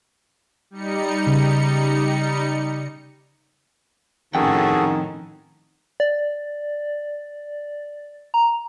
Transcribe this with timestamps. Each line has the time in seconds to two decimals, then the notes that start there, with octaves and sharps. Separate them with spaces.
0.70 G3 D#4 C#7
1.27 C#3
4.35 F2 A2 D#3 C#4 F#4 G#4 A4 G5
6.00 D5
8.34 A#5